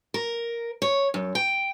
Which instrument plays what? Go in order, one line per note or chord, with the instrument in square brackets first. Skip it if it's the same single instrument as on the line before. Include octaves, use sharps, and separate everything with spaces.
[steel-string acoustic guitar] A#4
C#5
F#2
G5